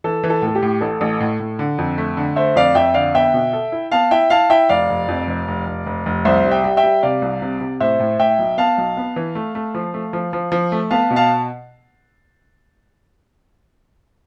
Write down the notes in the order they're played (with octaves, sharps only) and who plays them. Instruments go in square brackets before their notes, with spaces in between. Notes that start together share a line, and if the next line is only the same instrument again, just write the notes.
[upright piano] E3 [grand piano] A4
[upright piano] E3
[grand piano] A4
[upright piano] A2
[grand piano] A4
G4
[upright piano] A2
[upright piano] A1 [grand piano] A4
[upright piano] A1
A2
A2
D3
F2
A3
D3
[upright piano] A3 [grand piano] C5 E5
[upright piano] F2 [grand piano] D5 F5
[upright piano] F2 [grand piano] E5 G5
[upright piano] D3 [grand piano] D5 F5
[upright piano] B3 [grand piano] E5 G5
[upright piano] B2
A4
E4
[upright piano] B3 [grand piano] F5 A5
[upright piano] E4 [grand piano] E5 G5
[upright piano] E4 [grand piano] F5 A5
[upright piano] E4 [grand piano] E5 G5
[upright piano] F1 [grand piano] D5 F5
[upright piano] F1
F2
F1
F1
F1
F1
F1
[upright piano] C2 [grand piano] C5 E5
[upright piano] G3
[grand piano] E5 G5
[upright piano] G3
[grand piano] E5 G5
[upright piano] G3
[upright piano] C3 [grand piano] D5 F5
[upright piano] C2
C3
C3
[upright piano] A2 [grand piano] C5 E5
[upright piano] A2
[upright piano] A2 [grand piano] E5 G5
[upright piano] B1
[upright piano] B3 [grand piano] F5 A5
[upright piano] B1
B3
E3
A3
A3
F3
A3
F3
F3
F3
A3
[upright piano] B3 [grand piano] F5 A5
[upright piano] B2
[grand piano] F5 A5